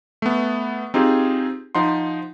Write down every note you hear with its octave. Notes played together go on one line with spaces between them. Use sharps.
A3 B3
C4 D#4 F4 G4 G#4
F3 D#4 F#5 C6